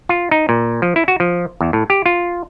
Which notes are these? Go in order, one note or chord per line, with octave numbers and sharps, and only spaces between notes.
F4
D#4
A#2
F3
E4
F#4
F3
E2
A2
G4
F4